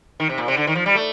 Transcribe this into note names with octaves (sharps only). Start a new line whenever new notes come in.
D#3
C3
A#2
C3
D3
D#3
F3
G3
A3